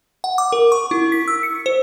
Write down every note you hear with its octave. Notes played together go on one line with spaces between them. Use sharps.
F#5
D6
A#4
C#6
E4
B6
E6
C#7
C5